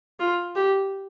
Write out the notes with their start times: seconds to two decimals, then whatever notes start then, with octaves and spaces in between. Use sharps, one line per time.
0.20 F4
0.56 G4